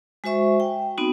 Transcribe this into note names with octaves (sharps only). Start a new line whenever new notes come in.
G#3 F#4 C5 E5 C#6
G5
B3 C4 D#4 F#4